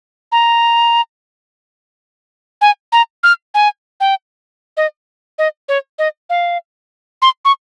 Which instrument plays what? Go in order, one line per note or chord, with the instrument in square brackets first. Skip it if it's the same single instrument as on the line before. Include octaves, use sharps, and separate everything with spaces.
[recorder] A#5
G#5
A#5
F6
G#5
G5
D#5
D#5
C#5
D#5
F5
C6
C#6